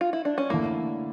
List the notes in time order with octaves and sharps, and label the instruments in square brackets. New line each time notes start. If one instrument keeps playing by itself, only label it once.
[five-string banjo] F4
E4
D4
C#4
[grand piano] D3 A3 E4 [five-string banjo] A#3